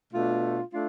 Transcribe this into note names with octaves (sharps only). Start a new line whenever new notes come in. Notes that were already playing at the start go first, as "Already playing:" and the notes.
B2 A3 D4 F4
A3 D4 F4